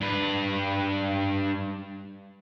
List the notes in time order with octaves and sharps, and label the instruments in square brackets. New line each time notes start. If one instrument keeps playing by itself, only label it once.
[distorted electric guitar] G2 B4